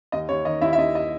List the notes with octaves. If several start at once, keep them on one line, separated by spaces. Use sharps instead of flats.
D#2 D#5
D#2 C#5
D#3 D#5
D#2 E4 E5
E5
D#2 D#5
D#5